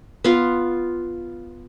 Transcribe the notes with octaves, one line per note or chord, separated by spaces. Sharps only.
B3 F4